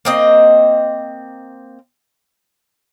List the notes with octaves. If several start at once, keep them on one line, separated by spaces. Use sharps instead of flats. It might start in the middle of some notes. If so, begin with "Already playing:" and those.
A#3 C4 D#5